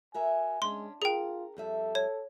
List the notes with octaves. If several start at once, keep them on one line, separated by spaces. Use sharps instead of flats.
F#4 A#4 E5 G#5
G#3 C#4 D4 C6
F4 G#4 A#4 G5
F2 G3 A4 E5
C#5